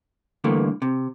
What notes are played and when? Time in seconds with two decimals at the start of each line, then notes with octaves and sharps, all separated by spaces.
0.44 G2 D3 E3 A3 A#3
0.82 C3